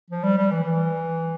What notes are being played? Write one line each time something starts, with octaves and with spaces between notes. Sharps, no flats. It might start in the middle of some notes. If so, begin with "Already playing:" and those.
F3
G3
G3
E3
E3